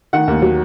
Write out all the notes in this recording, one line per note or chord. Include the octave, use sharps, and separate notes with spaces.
D#3 F#5
D#2
F#3